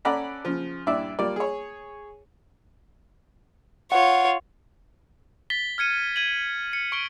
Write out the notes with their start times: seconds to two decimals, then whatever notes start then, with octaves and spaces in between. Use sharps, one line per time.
0.05 C#4 A4 D5 F#5 A#5 B5
0.45 C#3 F3
0.87 G2 A#2 E4 D5 E5
1.19 G3 A#3 F4 D5
1.36 G#4 C#5
3.92 F4 C#5 F#5
5.50 A6 B6 G7
5.78 F6 G#6 C#7 D#7
6.16 G#6 D#7 F#7
6.73 C#7
6.92 C#6 D7 G7